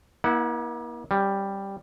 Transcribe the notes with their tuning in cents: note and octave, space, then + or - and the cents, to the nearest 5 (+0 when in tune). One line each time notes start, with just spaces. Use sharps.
A#3 +40 E4 -30 F#5 +0
G3 +5 C#4 -25